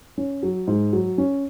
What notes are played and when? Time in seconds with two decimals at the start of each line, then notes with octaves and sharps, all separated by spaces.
0.18 C#4
0.43 F#3
0.67 G#2
0.93 F#3
1.18 C#4